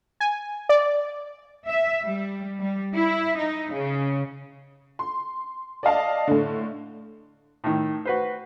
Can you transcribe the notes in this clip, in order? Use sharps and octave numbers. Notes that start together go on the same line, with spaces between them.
G#5
D5
E5
G3
G3
E4
D#4
C#3
C6
D5 D#5 F5 A5
A2 D3
A2 D#3
F#4 B4 C5